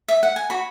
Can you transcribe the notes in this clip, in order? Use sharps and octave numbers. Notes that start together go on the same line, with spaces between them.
E5
F#5
G#5
F#4 B5